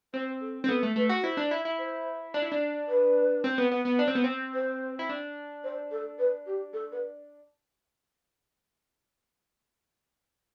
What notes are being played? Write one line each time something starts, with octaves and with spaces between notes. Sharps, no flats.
C4 C5
A4
C4
B3 A4
A3
A3 B4
F#4
E4 C5
D4
E4
E4
C5
D4
E4
D4
B4
C4
B3
B3
B3
D4
C4
B3
C4
C5
E4
D4
C5
A4
B4
G4
A4
B4